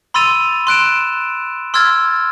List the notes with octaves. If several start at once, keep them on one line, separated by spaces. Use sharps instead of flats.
B5 C6 E6 A6 D#7 F7
C6 F#6 D7 E7
C6 E6 F6 G#6 A6